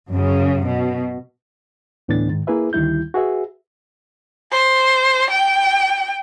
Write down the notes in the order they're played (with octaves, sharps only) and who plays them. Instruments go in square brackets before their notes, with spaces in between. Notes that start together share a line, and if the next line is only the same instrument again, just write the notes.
[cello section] F#2 C#3
B2
[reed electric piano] D2 A2 E3 B3 D4 A6
G#2 D#3
A#3 E4 G#4 B4 E5
D2 D#3 G3 E4 G6
F#4 G#4 B4 E5
[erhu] C5
G5